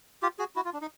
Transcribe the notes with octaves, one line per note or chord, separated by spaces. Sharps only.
F4 G4
F#4 G#4
E4 F#4
F4
D4
D#4